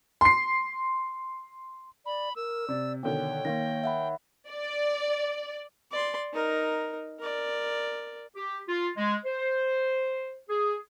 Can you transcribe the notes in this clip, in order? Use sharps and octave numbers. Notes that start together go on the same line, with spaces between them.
C6 C7
D5 B5
A#4 E6
C3 D5
B2 D3 D#3 C#5 G5
D#3 A#3 F5 A#6
E5 F#5 B5
D5
D5 C6
D#4 A#4
A#4 D5
G4
F4
G#3
C5
G#4